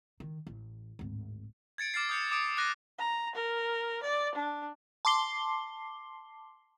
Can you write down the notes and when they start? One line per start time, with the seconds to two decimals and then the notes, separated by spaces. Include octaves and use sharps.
0.20 D#3
0.47 A1
0.99 D1 G#1
1.78 G#6 A6 C#7 D7
1.94 D6 F6 A6 C7
2.09 D#6 G6 C#7
2.31 D6 D#6 C#7 D7
2.57 D6 F#6 A#6 C7 D#7
2.99 A#5
3.35 A#4
4.03 D5
4.35 D4
5.05 A5 C6 D6 C7 G7